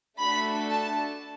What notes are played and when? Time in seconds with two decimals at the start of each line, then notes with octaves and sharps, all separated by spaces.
0.18 A3 D4 F#4 A4 B5
0.69 A5